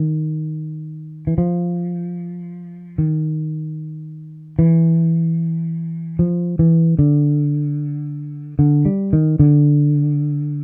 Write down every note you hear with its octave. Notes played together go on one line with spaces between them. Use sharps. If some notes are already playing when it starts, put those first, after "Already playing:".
Already playing: D#3
E3
F3
D#3
E3
F3
E3
D3
D3
G3
D#3
D3